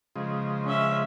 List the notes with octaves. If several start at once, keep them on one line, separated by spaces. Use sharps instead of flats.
C#3 F3 G#3
C#4 E5